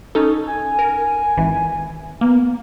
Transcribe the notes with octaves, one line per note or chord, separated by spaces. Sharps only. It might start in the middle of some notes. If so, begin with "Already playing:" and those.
C#4 D#4 A4
G#5
A#4
G#1 E3
A#3 B3